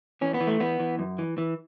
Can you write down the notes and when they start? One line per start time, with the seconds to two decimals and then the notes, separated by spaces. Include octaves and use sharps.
0.21 E3 C#4
0.34 B3
0.41 E3
0.47 A3
0.60 E3 B3
0.80 E3
0.99 F#2
1.18 E3
1.38 E3